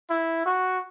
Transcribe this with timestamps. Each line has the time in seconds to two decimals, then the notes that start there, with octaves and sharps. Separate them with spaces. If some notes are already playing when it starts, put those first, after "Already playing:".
0.10 E4
0.46 F#4